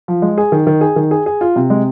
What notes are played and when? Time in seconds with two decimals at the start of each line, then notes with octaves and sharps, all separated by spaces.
0.08 F3
0.22 G#3
0.38 G#4
0.52 D#3
0.67 D#3
0.81 G#4
0.96 D#3
1.11 G#4
1.26 G#4
1.41 F4
1.56 C3
1.70 G#3